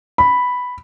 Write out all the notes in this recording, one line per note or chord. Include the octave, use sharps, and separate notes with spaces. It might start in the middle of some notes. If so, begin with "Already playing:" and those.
B5